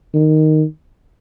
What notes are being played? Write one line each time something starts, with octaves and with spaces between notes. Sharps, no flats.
D#3